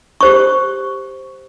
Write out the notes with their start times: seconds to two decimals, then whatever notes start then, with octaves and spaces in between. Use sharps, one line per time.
0.21 G4 C5 C#6